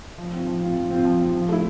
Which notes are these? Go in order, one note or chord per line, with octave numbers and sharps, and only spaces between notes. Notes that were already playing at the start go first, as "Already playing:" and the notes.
F3
C4 F4
F3
C4 F4
F3
C4 F4
F3
C4 F4
F3
A3 E4